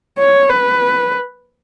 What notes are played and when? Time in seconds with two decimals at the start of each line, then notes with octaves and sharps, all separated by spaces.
0.18 C#5
0.49 B4